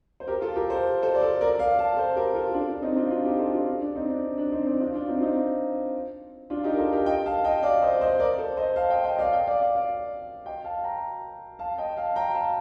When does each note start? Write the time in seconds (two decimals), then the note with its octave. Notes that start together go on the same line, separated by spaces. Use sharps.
0.20 C5
0.27 G4 A#4
0.41 F4 A4
0.56 G4 A#4
0.70 A4 C5
1.02 A4 C5
1.15 D5
1.22 A4 C5
1.41 A#4 D5
1.59 D5 F5
1.78 F5 A5
1.97 A4 C5
2.16 G4 A#4
2.34 F4 A4
2.54 D4 F4
2.69 D4
2.82 C4 D#4
2.96 D4 F4
3.10 D4 F4
3.25 D#4 G4
3.39 F4 A4
3.52 D4 F4
3.67 D4
3.81 D4
3.96 C4 D#4
4.09 D4
4.38 D4
4.52 C4 D#4
4.66 C4 D#4
4.80 D4 F4
4.94 D4 F4
5.08 C4 D#4
5.19 F4
5.23 C4 D#4
6.50 D4 F4
6.64 D#4 G4
6.73 A#4
6.78 F4 A4
6.93 G4 A#4
7.06 D#5 G5
7.26 F5 A5
7.44 D#5 G5
7.63 D5 F5
7.82 C5 D#5
8.01 C5 D#5
8.20 A#4 D5
8.38 A4 C5
8.57 C5 D#5
8.76 F5 A5
8.90 D#5 G5
9.04 D#5 G5
9.15 D#5
9.19 D5 F5
9.33 D#5 G5
9.47 D5 F5
9.61 D5 F5
9.75 D5 F5
10.46 D#5 G5
10.64 F5 A5
10.84 G5 A#5
11.59 F5 A5
11.78 D#5 G5
11.97 F5 A5
12.16 G5 A#5
12.35 F5 A5